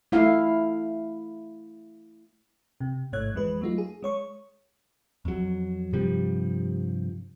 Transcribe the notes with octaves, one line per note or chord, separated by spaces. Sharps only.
A3 E4 F5
C3
A1 G#2 A3 C#5 F#6 G#6
F2 E3 G#3 B4
F#3 A3 D#4 F4
G#4
G#3 C#5 C#6
F2 F#3
G2 C3 F3 G3